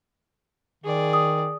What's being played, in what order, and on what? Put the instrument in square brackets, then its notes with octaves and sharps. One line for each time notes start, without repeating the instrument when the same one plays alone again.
[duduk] D#3 [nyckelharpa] G#4 D5
[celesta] D#6